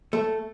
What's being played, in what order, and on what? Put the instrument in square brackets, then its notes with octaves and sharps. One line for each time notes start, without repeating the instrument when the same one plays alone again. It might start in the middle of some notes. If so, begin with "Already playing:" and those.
[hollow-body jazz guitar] A3